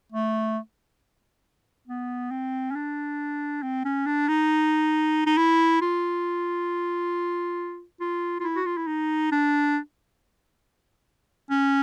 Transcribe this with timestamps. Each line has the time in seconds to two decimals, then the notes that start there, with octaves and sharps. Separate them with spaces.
0.12 A3
1.88 B3
2.31 C4
2.71 C#4
2.76 D4
3.62 C4
3.85 C#4
4.06 D4
4.28 D#4
5.26 D#4
5.37 E4
5.81 F4
8.01 F4
8.40 F4
8.44 E4
8.56 F#4
8.66 F4
8.77 E4
8.87 D#4
9.32 D4
11.50 C#4